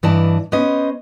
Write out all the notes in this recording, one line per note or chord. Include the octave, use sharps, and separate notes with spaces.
G2 E3 D5 D#5 A5
B3 C#4 C5 D#5